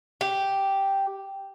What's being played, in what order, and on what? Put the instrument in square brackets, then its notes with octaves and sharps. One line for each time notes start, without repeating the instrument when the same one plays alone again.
[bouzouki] G4